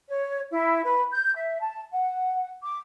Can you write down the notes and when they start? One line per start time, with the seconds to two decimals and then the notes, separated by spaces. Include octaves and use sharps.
0.08 C#5
0.50 E4
0.84 B4
1.11 G6
1.35 E5
1.60 A5
1.91 F#5
2.62 D6